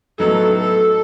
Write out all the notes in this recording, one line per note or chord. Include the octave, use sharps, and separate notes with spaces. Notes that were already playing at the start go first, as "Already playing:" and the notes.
A2 F#3 B3 D#4 A4
A4